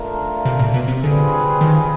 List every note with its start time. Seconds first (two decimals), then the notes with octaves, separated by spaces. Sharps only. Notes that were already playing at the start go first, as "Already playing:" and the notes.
Already playing: A3 D4 F4 A#4
0.45 C3
0.59 A#2
0.74 B2
0.88 C3
1.03 D3 G3 C4 F4 G#4 B4
1.61 D#3